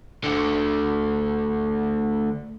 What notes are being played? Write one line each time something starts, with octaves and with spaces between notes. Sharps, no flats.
D2 D3